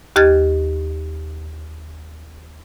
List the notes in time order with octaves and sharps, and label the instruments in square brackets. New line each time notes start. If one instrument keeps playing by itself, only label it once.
[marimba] D#2 G4 D#5 F6 G#6 A6